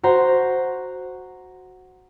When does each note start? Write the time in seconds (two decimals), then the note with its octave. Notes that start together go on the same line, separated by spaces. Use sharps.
0.03 F#4 C5 A#5